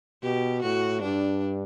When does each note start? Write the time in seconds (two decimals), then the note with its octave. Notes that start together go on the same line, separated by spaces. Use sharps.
0.23 B2 G4
0.62 A2 F#4
1.01 G2 D4